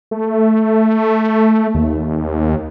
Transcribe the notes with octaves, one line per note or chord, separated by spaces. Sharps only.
A3
D#2